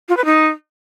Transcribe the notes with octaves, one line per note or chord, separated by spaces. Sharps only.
F4
B4
D#4